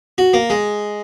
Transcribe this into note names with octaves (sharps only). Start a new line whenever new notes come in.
F#4
A#3
G#3